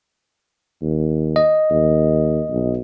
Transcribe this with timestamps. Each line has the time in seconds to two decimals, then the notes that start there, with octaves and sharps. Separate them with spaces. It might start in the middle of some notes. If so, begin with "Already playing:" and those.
0.82 D#2
1.36 D#5
1.71 D#2
2.50 B1